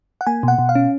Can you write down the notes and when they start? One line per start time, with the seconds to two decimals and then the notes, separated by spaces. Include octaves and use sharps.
0.21 F#5
0.27 A#3 G#5
0.43 B2 F#5
0.58 B2
0.69 F5
0.75 C#4